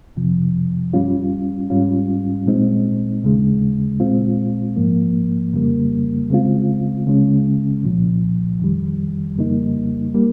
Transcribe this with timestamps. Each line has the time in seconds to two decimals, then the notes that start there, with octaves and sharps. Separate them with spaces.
0.16 F2 C3 F3
0.93 G2 G3 C#4 F4
1.70 G#2 G3 C#4 F4
2.46 A#2 G#3 C4 D#4
3.23 D#2 C#3 G#3
4.00 A#2 G#3 C4 F4
4.76 G#2 F3 A#3
5.53 F2 C#3 G3 A#3
6.30 C#3 G#3 C4 F4
7.06 C#2 C#3 G#3 C#4
7.83 C2 A#2 F3
8.59 F2 D#3 G3
9.37 F2 C#3 G3 A#3 D#4
10.14 G3 A#3